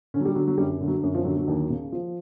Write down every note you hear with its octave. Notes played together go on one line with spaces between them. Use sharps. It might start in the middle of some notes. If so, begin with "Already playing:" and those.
D3 C#4
F#3
G3
D3 F#3
F#3
F#2 G3
D3
F#3
F#2
F3
D3 F#3
F#3
D#2
C#3
F3